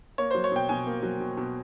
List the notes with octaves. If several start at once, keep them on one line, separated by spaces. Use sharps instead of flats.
A#3 C#5
C5
F#3
C#5
B2 G5
B2 G#5
A#3
F#3
B2
B2